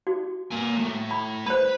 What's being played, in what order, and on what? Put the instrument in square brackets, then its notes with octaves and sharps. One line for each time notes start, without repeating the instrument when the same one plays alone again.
[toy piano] F#4
[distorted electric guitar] A#3 G#5
A2 A3
[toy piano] B5
[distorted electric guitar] B4 [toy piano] C5 B5